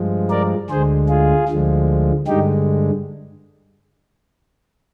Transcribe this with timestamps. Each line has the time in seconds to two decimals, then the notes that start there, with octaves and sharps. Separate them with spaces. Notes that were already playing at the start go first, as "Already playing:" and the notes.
Already playing: G2 F3 G#3
0.30 A#4 D5
0.70 D2 D3 G#3 G#4 C5
1.09 F4 G#4
1.49 D2 D3 F3 G#3
2.27 G2 D3 G#3 D#4 G4